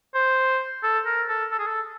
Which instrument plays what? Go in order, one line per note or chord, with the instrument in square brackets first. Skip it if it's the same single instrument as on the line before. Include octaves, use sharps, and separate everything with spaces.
[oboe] C5
A4
A#4
A4
A4
G#4
A4